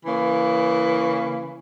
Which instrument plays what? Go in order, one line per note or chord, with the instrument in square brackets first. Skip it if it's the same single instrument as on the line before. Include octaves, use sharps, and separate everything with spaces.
[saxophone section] C#3 E3 A#3